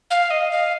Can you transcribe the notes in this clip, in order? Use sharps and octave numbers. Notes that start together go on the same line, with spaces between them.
F5
D#5
F5